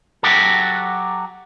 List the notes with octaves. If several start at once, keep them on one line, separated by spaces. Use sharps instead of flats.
F#3 F#4 G4 A4